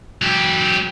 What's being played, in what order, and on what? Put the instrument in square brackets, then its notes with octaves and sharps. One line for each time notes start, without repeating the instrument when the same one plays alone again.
[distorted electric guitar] F#3 G4